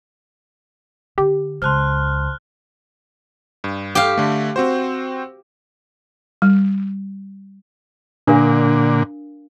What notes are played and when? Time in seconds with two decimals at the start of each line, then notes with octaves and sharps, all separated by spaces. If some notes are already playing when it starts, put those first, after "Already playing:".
1.18 D3 G4
1.62 C#2 G#3 C5 A5 C6 F6 F#6
3.64 G2
3.95 G4 F5
4.17 D3 A3
4.56 C4 F#4 C5
6.42 G3
8.28 A#2 D3 D4 A#4 F5